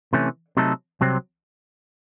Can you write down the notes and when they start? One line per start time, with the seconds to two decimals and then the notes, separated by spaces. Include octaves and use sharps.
0.13 C3 E3 A3 C#4
0.57 C3 F#3 A3 D#4 A4
1.01 C2 C3 F#3 C4